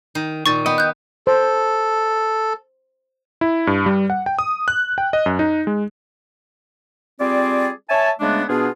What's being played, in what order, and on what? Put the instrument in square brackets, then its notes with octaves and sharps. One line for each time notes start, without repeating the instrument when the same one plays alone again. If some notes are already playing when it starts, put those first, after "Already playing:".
[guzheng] D#3
[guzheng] A#2 D#3 [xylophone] C#6 A6
[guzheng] B3 [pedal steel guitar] D#5 G5
[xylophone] F#6 G6
[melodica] A4 [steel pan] C5
[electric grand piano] E4
G2
G3
F#5
G5
D#6
F#6
G5
D#5
F#2
D#4
G#3
[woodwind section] G3 C4 F4 G#4 D5
C#5 E5 G#5 A5
C#3 G#3 A3 B3 D4
B2 B3 D4 F4 G#4